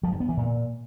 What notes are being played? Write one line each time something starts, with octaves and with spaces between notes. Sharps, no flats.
F3
G2
B3
E3
A#2